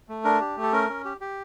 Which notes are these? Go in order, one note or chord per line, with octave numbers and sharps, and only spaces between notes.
A3
D4 A#4
G4
A3
A4
C#4 A#4
C#4
G4
G4